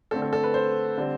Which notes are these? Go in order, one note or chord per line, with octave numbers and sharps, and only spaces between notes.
D3 A3 C4 A4
A4
A4
B4
C5
D3 G3 C4